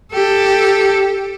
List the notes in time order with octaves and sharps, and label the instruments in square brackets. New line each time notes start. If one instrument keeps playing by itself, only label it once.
[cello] G4 A4